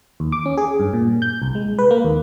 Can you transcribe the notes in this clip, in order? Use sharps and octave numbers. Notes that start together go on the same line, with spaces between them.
D#2
D6
C#4
G#4
G2
A#2
G6
C2
G#3
B4
A#3
D#2